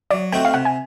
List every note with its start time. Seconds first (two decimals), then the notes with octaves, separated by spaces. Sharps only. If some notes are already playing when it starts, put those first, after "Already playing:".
0.11 F#3 D5
0.32 A3 C4 D#4 F#4 G5
0.45 F5
0.54 C3 F#5
0.65 G#5